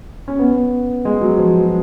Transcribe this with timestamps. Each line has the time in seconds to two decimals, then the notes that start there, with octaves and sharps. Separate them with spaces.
0.28 C#4
0.39 B3
1.05 G#3
1.21 F#3
1.38 F3
1.54 F#3